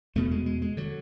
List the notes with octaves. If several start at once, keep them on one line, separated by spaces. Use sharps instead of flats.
E2 B2 A3
G#3
G#3
G#3
D3 F#3